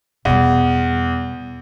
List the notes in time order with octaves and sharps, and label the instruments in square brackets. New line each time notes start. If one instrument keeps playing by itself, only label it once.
[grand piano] E2 [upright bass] B2 G3